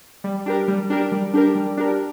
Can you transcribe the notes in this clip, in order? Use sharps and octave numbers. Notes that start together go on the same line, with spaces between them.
G3
D4 G4 A#4
G3
D4 G4 A#4
G3
D4 G4 A#4
G3
D4 G4 A#4